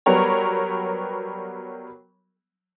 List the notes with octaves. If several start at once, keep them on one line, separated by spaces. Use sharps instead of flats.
F#3 G3 B3 A#4 C#5